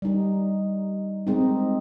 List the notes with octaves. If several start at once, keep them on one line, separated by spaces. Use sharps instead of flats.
G3 D#4
G#3 C4 D#4